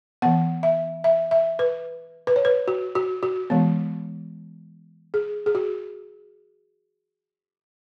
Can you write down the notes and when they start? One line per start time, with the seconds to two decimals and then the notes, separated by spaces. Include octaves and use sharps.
0.22 E3 B3 F#5
0.63 E5
1.04 E5
1.31 E5
1.59 B4
2.27 B4
2.36 C#5
2.45 B4
2.68 F#4
2.95 F#4
3.23 F#4
3.50 E3 G#3 B3
5.14 G#4
5.46 G#4
5.55 F#4